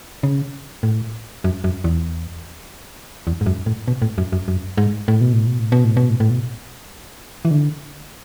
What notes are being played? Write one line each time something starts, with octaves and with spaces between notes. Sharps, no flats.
C#3
A2
F#2
F#2
E2
E2
G#2
F#2
A2
B2
A2
F#2
F#2
F#2
G#2
A2
B2
A2
B2
A2
B2
A2
B2
A2
A2
B2
E3
D3